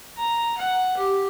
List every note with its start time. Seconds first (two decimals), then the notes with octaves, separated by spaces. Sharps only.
0.17 A#5
0.58 F#5
0.97 G4